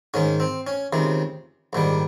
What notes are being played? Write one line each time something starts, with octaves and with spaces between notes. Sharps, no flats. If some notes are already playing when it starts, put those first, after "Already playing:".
G#2 D#3 G#3 C#4
C4
C#4
C#2 C3 D#3 G#3
A#1 G#2 D#3 G3